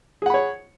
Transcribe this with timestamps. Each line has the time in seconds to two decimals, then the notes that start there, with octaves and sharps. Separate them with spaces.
0.22 G#4
0.26 F#5
0.30 B5
0.34 C#5